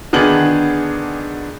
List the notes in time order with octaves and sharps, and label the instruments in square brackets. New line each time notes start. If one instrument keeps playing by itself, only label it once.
[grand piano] D3 D#3 B3 D4 G#4 F#7